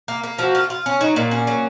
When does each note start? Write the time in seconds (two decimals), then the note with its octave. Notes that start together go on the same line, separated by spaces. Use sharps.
0.08 A#3
0.23 A#3
0.39 F3 F#4
0.55 F4
0.70 F4
0.86 C#4
1.01 F#3 D#4
1.16 A#2 A#3
1.31 C#4
1.47 F#3